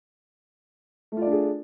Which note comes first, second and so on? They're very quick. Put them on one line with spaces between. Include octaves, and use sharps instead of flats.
A3 F4 D5 D4 G#4